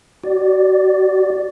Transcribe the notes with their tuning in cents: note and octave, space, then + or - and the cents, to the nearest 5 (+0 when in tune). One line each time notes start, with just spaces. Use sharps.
F#4 +30 D5 +0